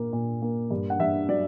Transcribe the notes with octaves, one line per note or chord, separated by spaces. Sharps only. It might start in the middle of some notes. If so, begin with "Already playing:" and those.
Already playing: A#2 A#3
A#2
A#3
G2
F#5
G2 E5
F#3 D5